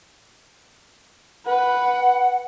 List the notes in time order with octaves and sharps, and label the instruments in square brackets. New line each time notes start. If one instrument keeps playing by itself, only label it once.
[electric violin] B4 [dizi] F#5